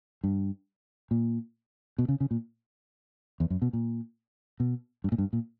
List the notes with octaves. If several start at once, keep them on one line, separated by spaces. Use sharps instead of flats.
G2
A#2
B2
C#3
C#3
A#2
E2
F#2
B2
A#2
B2
G2
A#2
G2
A#2